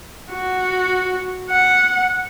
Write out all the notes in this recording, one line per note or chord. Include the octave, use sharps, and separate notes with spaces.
F#4
F#5